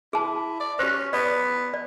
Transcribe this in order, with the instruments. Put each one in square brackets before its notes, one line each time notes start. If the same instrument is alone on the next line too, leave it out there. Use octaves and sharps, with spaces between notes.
[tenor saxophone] E4 [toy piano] G#4 A5
[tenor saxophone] D5
[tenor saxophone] C#4 [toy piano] G4 C5
[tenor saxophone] B3 [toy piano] D5
[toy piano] D5